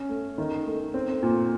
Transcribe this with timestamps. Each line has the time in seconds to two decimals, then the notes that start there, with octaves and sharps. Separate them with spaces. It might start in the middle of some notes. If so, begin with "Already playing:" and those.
Already playing: C#4
0.09 A3
0.38 D#3
0.67 A3
0.94 C4
1.23 A#2